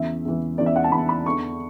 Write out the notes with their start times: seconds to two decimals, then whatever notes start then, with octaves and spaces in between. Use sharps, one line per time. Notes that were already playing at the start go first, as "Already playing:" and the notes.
Already playing: E2 C#3 E3 E5
0.25 E2 C#3 E3
0.58 E2 C#3 E3 D5
0.66 E5
0.76 F#5
0.84 A5
0.92 E2 C#3 E3 B5
1.09 B5
1.26 E2 D3 C#6